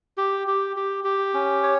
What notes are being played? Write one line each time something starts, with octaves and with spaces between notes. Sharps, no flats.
G4
G4
G4
G4
C#4
C#5